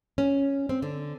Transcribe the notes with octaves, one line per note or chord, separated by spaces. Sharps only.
C#4
C4
D3